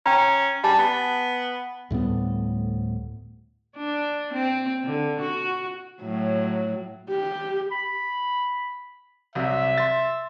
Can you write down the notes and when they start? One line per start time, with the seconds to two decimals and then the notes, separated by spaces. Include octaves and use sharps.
0.06 C#4 G5 A#5
0.64 G3 G#5 A5
0.79 B3
1.90 D2 A2 G3 B3
3.76 D4
4.33 C4
4.84 D3
5.21 F#4
6.02 A2 F#3
7.11 G4
7.71 B5
9.35 C2 C3 F#3 E5
9.78 C6 A6